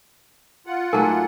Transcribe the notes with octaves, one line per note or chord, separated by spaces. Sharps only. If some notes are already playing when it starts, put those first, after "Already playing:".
F4 F#5
G#2 F#3 A3 A#4 G#5 A5